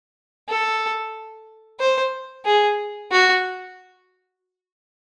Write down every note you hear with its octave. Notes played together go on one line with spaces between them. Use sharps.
A4
C5
G#4
F#4